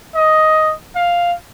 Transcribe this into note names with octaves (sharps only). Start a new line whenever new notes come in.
D#5
F5